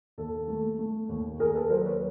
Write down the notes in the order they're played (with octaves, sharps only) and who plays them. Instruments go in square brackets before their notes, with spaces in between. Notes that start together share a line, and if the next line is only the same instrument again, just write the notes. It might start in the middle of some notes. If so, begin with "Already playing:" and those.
[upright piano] D#2 A4
A3
A3
D#2
D#2 G#4 A#4
A4 B4
F#3 A#4 C5
B4 C#5